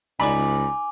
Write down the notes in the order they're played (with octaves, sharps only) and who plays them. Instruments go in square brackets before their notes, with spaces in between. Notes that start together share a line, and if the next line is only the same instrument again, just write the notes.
[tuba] C#2 [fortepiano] D#4 D5 B5 [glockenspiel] G#5 D6